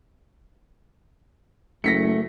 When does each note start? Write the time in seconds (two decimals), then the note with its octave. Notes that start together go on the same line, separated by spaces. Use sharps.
1.84 F#1 A3 A#6 B6 C#7